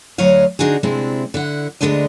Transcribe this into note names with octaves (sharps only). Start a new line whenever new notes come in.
D2 F#3 C#5 D#5 F5
D3 D4 D#4 F#4 G#4
C3 G#3 C4 D4 E4
D3 E4 F#5
D2 G#2 D3 G#3 D4 D#5